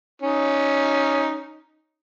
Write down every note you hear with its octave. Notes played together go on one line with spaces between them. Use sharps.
C#4 D#4